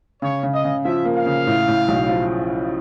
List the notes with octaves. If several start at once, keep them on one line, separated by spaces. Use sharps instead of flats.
C#3 C#5
C#3
D#5
C#3
F3 E5
A#3
F5
C#3
A2
A2
B1
F3